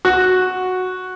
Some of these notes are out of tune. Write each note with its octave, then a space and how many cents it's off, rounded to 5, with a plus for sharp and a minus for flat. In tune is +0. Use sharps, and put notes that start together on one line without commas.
F#4 -5